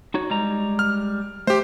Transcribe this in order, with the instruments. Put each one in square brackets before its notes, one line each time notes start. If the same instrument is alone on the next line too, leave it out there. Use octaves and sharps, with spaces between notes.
[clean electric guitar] D#4 F#4 C#5
G3 G#3 A#5
[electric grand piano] F6
[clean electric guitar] A3 [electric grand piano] G4 C5